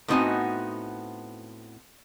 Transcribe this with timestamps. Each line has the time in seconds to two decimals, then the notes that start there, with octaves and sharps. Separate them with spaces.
0.08 A2 B3 C4 D#4 F#4 G#5